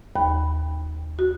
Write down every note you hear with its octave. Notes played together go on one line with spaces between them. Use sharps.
D#2 B5
F#4